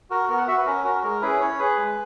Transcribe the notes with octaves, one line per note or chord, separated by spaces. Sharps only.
F#4 A#4
B3 A#4
F#5
F#4 E5
B4
C#4 A#4
F#4 A#4
G#3 A#4
C#4 E4 G#4 B4
C#4 C#5
G#4 B4
G#3